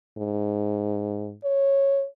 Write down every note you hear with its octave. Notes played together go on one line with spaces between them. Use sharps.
G#2
C#5